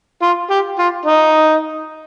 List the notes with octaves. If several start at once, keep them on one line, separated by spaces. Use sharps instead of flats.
F4
G4
F4
D#4